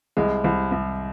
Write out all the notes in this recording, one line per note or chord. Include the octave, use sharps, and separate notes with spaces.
C2 G#3
C2
C2